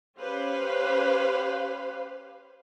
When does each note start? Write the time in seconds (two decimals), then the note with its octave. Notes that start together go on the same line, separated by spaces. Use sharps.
0.18 C#4 G4 B4 C5 F5